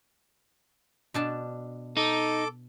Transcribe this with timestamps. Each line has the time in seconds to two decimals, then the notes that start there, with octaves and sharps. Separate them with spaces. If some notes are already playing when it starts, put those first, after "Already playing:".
1.14 B2 D4 A5
1.97 D#4 A4 D6